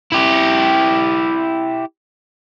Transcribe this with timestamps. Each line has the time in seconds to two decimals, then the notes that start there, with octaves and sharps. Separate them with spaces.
0.12 E4 G4